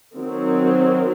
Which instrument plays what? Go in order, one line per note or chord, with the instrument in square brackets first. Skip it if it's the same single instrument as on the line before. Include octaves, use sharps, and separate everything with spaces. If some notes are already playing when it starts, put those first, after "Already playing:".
[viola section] D#3 F#3 C4